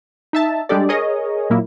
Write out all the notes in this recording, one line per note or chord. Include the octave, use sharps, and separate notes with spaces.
D#4 E5 A5
G3 G#3 D4 G4 A4 D5
G#4 A#4 C#5 D#5
A#2 F#3 A#3 E4